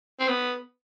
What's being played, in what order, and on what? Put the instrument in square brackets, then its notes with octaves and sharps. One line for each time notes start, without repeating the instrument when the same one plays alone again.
[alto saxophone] C4
B3